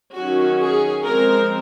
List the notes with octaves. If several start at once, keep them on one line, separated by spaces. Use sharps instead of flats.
D#3 F#3 C#4 F#4
G#4
F3 G#3 C4 A#4